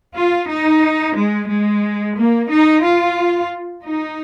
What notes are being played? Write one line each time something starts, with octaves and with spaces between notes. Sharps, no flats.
F4
D#4
G#3
G#3
A#3
D#4
F4
D#4